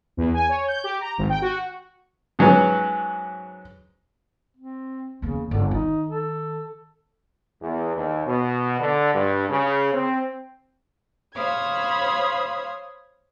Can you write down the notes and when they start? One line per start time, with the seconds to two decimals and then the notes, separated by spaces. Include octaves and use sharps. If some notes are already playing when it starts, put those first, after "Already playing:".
0.17 E2
0.34 G#5
0.49 C#5
0.67 G6
0.84 G4
1.00 A#5
1.18 G#1
1.29 G5
1.42 F#4
2.39 G#2 F#3 B3 C#4
4.57 C4
5.22 E2 C#3 A#3
5.51 G1 D3
5.71 D#3 D#4
6.09 A4
7.61 E2
7.95 D#2
8.26 B2
8.80 D3
9.14 G2
9.49 C#3
9.93 C4
11.37 C5 C#5 F5 B5 D#6 G#6